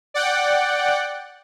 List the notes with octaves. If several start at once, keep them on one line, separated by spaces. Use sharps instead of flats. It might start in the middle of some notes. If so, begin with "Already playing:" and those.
D5 F#5 G5